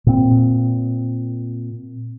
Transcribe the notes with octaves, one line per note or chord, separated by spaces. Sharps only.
A#2 C4